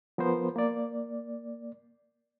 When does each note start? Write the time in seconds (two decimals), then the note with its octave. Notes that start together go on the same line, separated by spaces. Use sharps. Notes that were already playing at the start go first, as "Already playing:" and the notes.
0.18 F3 B3 A#4 C5
0.56 A#3 D5